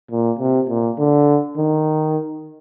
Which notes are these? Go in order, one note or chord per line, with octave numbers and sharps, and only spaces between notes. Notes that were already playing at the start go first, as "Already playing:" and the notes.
A#2
C3
A#2
D3
D#3